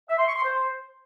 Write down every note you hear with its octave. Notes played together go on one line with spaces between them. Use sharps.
E5
C6
C#6
C6
C5